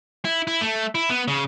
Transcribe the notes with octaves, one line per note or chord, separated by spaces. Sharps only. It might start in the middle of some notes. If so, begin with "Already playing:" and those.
E4
E4
A3
E4
B3
C#3